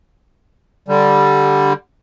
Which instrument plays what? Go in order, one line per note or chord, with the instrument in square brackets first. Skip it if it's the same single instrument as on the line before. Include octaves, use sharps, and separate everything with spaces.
[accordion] D3 G3